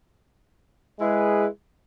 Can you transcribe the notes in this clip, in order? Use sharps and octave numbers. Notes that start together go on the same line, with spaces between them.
G#3 E4 G#4 B4